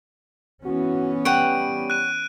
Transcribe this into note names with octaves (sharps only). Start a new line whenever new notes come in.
E3 B3 C#4 F#4
G3 C#5 F#5 G5 D7 D#7
F#6 D#7